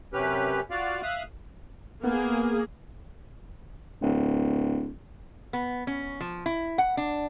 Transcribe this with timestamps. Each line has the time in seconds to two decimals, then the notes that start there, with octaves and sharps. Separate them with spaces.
0.13 F#2 C3 C#4 G4 B4 F6
0.70 F4 F#4 D5 F5
1.03 E5 F5 D#6 F#6
2.03 A#3 B3 G#4
4.02 D1
5.53 B3
5.87 C#4
6.21 F3
6.46 E4
6.78 F#5
6.97 D4